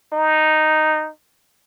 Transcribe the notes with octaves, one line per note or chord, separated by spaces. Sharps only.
D#4